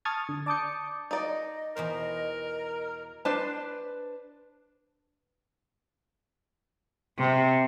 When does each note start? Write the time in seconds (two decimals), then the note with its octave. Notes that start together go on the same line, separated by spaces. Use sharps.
0.05 A5 C#6 D#6 F6 G#6 A6
0.29 D3
0.46 D5 A5 D6 D#6 G6 C#7
1.11 D#4 D5 D#5
1.77 E2 B2 A#4 C5
3.25 D4 B4 C5 A5
7.18 C3